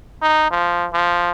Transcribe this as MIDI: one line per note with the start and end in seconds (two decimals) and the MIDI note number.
0.22 0.50 63
0.51 0.87 53
0.93 1.32 53